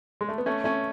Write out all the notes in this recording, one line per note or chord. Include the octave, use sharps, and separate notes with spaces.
G#3
A3
B3
A3 C#4
A3 C#4